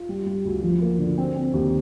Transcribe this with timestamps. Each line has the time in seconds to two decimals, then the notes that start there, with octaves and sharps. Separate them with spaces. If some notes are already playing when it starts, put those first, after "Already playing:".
Already playing: F4
0.09 G3
0.26 G3
0.45 D2
0.63 F3
0.81 A#3
0.99 D3
1.18 C4
1.36 C4
1.53 D#2